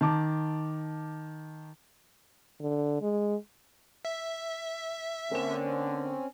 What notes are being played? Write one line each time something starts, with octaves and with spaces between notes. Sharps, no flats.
D#3 A5 D6
D3
G#3
E5
D3 A#3 C4 C#4 E7